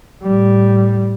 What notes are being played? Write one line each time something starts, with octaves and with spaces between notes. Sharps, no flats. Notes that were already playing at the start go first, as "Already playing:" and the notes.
A2 G3